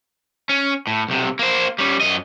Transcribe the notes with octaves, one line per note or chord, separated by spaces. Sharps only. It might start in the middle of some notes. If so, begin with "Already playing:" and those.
C#4
A2
B1 C3
A#3 C5
G3 C#4
F#2 D#5